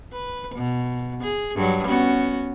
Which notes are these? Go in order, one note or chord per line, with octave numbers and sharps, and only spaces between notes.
B4
B2
G#4
G2 F#3
B3 C#4 F#4